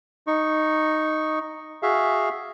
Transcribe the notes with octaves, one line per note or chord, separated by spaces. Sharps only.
D#4 C#6
F#4 G#4 E5 F5